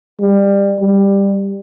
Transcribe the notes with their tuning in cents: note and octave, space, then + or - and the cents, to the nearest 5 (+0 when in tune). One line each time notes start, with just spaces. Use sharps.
G3 +25
G3 +15